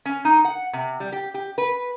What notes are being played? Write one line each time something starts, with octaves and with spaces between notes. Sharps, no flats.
C#4
D#4
F#5
C3
G3
G4
G4
B4